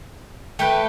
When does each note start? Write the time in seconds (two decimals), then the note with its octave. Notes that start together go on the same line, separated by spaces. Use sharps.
0.59 A3 B4 G5